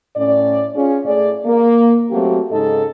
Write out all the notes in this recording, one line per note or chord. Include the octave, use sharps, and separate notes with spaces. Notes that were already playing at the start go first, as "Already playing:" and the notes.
A2 C#4 D5
C#4 F4 G#4
A2 G#4 D5
A#3
F#3 A3 A#3 C4 F#4 G4
G#2 C#3 D#4 A4 D#5